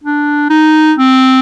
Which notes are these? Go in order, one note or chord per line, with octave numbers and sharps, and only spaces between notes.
D4
D#4
C4